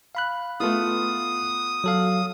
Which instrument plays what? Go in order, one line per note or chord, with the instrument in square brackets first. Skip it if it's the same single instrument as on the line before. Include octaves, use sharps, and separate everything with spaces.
[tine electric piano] F5 B5 F#6
[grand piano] A3 B3 F4 [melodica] D#6
[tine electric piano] F#3 A4 F5